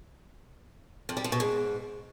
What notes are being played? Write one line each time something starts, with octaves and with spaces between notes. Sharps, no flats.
F2
G3
F3
B2
G#2